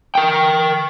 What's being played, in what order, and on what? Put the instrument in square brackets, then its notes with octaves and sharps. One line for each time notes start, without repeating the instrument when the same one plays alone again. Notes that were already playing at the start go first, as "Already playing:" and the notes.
[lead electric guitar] A#4 G5